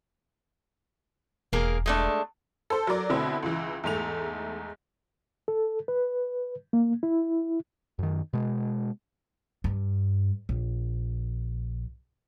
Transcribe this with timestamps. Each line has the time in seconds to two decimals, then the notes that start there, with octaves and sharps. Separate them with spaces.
1.53 E1 A#3 G#4 A#4
1.86 G#3 A3 D4
2.70 A4 C5
2.87 F#3 A#4 D5
3.09 B2 D3 A3 C4 E4
3.43 C#2 E3
3.84 E2 G#2 A3 F7
5.48 A4
5.88 B4
6.73 A#3
7.03 E4
7.99 F#2 D#3
8.33 B2 G#3
9.64 G2
10.49 A#1